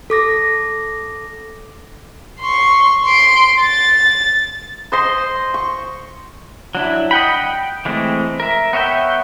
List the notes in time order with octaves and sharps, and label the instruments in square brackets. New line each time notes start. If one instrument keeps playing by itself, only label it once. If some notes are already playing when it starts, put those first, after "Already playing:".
[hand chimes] A4 D6 A#6
[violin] C6 C#6
C6 D7
A6
[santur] C5 D#5 C6
C#6
[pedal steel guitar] F#3 D4 E4
D#5 F#5 G5 B5
G5
E3 G#3 A3 C4
A#4 E5
B3 C#5 E5 G5